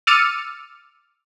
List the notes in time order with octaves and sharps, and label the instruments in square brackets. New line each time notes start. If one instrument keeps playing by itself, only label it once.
[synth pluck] D6 E6 F6 A6 C#7 D#7